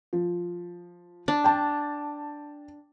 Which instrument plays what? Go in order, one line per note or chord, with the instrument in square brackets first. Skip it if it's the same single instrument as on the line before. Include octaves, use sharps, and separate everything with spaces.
[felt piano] F3
[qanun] D4
[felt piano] G5 A5